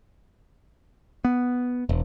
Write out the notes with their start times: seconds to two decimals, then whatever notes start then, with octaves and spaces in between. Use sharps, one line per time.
1.25 B3
1.89 E1